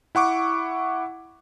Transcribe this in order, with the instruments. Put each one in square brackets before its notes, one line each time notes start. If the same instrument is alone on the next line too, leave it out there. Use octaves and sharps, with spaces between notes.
[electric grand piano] E4 F#5 C#6 D6